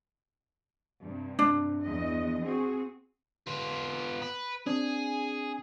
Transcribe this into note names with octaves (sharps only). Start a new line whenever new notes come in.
G2 C3
D4
E2 D#5
C4 F#4 G#4
B3 F4
B4
C4 D4 G#4